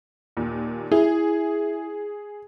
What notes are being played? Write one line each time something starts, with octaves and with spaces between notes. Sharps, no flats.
D#2 A#2
E4 G#4